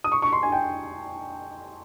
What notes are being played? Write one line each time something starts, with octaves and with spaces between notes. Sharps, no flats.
D#6
C#6
C#6
C6
G#5
G5